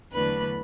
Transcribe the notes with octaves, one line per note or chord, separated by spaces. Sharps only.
E2 D3 F#3 A3 D4 B4 B5